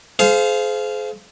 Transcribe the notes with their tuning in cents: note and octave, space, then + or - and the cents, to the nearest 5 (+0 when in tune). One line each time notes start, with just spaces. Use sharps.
G#4 +40 C5 -20 F5 -10